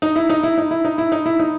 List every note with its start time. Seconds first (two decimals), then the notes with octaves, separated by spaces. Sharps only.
0.02 D#4
0.16 E4
0.30 D#4
0.43 E4
0.58 D#4
0.71 E4
0.85 D#4
0.98 E4
1.12 D#4
1.26 E4
1.39 D#4